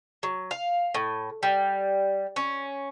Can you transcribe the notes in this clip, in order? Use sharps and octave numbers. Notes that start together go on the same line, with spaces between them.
F#3
F5
A2
G3
C#4